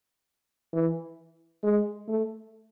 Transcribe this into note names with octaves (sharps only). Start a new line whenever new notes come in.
E3
G#3
A3